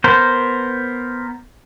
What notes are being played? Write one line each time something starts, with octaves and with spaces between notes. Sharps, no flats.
B3 A#4 C5